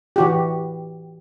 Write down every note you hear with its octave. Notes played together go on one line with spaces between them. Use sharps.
E3 F#4 G4